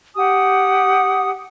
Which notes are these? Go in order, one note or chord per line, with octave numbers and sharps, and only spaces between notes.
G4 F#5 G#5 D#6